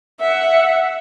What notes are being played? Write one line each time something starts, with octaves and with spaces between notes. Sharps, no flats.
E5 F#5